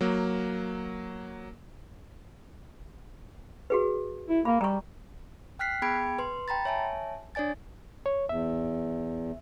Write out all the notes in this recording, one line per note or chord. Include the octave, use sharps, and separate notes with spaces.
F#3 A#3
F#4 G#4 B4
E4
A#3 B5
G3 A#5 C#6
G5 F6 F#6 B6 C7
B3 G#4 G5 B5 G#6 D7
B4 C6
G5 A#5 B5 A6
C#5 E5 G#5 A5
D4 C#5 D5 G#5 A6
C#5
E2 E5